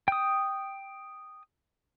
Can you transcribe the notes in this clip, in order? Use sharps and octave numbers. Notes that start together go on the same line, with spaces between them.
G5 D#6